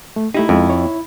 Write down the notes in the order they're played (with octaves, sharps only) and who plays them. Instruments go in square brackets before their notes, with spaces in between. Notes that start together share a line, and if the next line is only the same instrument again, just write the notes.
[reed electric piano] A3
[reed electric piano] A3 G4 [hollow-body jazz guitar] D#4 E4
[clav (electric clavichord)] F2 [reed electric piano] G#3 C#4
[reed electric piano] C#5